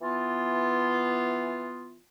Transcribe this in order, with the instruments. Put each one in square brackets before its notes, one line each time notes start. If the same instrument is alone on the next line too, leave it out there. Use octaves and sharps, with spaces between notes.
[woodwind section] E3 B3 F4